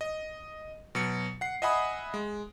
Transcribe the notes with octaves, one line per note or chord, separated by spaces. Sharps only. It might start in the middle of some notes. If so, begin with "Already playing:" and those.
D#5
B2 F#3 C#7
F#5 C7
D#5 E5 F#5 G#5 B5 D#6
G#3